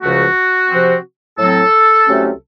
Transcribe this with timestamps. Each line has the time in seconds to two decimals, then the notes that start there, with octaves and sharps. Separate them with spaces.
0.02 C#2 C#3 F3 A3 F#4
0.70 C3 F3 C4
1.38 A2 F#3 C4 A4
2.07 C2 C3 F#3 A3 C#4